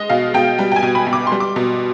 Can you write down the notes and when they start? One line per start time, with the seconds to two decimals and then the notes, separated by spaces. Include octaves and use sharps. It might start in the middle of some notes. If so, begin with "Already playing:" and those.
Already playing: G#3 D#5
0.09 B2 F5
0.34 B2 G5
0.58 G3 G5
0.72 G5
0.76 G#5
0.83 B2
0.95 B5
1.07 B2
1.13 D6
1.27 C6
1.32 G3
1.40 D6
1.56 B2